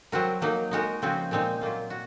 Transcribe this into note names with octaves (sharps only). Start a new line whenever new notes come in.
F#3 C4 F#4 A#4
F#3 A#3 D#4
G#3 D#4 F#4 A#4
C#3 F3 C4 F#4
A#2 G#3 C4 D#4
F#3 A#3 F4
F#4